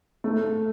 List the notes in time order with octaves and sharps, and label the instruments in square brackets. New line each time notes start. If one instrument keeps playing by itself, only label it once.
[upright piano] A3